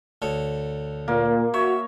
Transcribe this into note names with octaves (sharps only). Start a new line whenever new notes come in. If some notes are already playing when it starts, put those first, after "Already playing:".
D2 A4 C#5
A#2 A#3
F#4 C#5 E5